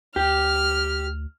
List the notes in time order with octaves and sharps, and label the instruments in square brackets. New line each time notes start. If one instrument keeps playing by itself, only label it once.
[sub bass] D2 [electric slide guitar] G4 [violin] F6